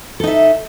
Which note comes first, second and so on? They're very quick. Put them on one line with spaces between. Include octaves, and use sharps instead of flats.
A4 D#4 E5